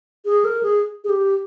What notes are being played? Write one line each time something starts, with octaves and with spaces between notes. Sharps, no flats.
G#4
A#4
G#4
G#4
G4